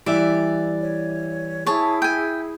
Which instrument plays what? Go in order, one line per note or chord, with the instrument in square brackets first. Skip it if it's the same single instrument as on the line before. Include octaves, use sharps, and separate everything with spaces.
[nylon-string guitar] E3 G3 E5 [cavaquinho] D5
[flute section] C#5
[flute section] E4 G#4 [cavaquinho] C#5 A5
[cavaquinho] G5 G#5